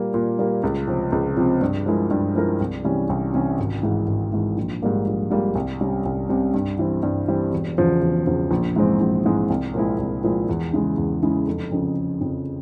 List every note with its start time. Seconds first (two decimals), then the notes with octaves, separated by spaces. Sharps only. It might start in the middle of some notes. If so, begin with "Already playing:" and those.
Already playing: A#2 G3 A#3
0.14 A#2
0.39 G3 A#3
0.63 C#2
0.87 C3 F3 C4
1.12 C#2
1.37 C3 F3 C4
1.61 G2
1.86 F3 G#3 E4 A#4
2.11 G2
2.35 F3 G#3 E4 A#4
2.61 C2
2.84 C3 E3 G3 C#4
3.09 C2
3.33 C3 E3 G3 C#4
3.59 G#1
3.83 G#2 E3
4.07 G#1
4.33 G#2 E3
4.57 A#1
4.82 G#2 G3 A#3 F4
5.07 A#1
5.31 G#2 G3 A#3 F4
5.55 C2
5.81 C3 G3 C#4
6.05 C2
6.29 C3 G3 C#4
6.54 G2
6.79 E3 G3 C4
7.03 G2
7.28 E3 G3 C4
7.53 E1
7.78 E2 C#3 F3
8.02 E1
8.27 E2 C#3 F3
8.51 A#1
8.76 G#2 E3 G#3 C4
9.01 A#1
9.25 G#2 E3 G#3 C4
9.50 C2
9.74 A#2 F3 G#3 E4
9.99 C2
10.23 A#2 F3 G#3 E4
10.49 E2
10.73 C#3 E3 G#3
10.98 E2
11.22 C#3 E3 G#3
11.46 F1
11.72 F2 C#3
11.97 F1
12.21 F2 C#3